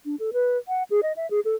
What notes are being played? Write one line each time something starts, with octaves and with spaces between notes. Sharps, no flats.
D4
A4
B4
F#5
G#4
D#5
E5
G#4
A4